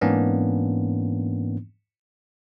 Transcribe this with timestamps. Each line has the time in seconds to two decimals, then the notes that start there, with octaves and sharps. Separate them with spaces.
0.01 G#2 E3 A#3 B3 C#4 D4